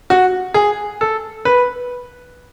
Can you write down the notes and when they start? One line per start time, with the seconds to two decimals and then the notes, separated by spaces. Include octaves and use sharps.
0.10 F#4
0.54 G#4
1.01 A4
1.45 B4